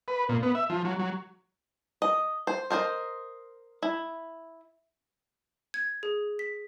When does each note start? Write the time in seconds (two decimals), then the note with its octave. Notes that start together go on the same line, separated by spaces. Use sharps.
0.08 B4
0.29 A#2
0.43 B3
0.55 E5
0.70 F3
0.85 F#3
0.99 F#3
2.02 D#5
2.47 C5
2.70 A#4 C5 D5 D#5
3.82 E4
5.74 G#6
6.03 G#4
6.39 B6